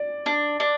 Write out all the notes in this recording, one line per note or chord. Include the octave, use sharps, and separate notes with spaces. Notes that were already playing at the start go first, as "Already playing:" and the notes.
Already playing: D5
D4
D4